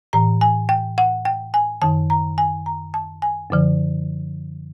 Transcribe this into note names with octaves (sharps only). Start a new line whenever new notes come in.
A2 E3 A#5
G#5
G5
F#5
G5
G#5
F#2 D#3 A5
A#5
G#5
A#5
A5
G#5
F#2 D3 F3